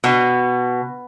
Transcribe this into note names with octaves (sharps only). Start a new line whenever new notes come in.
B2